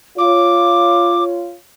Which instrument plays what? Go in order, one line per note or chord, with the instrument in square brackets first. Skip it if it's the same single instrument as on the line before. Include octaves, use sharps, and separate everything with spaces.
[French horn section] F4 C#5 [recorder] D6